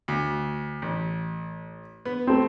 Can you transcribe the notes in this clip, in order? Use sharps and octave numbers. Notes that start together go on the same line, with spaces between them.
D2
A1
B3
A3 C4